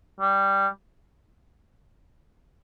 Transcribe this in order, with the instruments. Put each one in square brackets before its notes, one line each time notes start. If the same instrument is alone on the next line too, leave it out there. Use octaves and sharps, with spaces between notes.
[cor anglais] G3